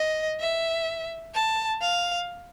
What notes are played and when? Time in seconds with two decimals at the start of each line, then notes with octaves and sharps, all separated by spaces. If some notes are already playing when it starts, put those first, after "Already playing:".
Already playing: D#5
0.40 E5
1.34 A5
1.81 F5